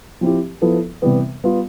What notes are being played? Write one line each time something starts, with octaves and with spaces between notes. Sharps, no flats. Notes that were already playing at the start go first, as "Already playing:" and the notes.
F3 C4 E4 G4
F3 B3 E4 A4
C3 E3 G3 B3
G3 B3 F4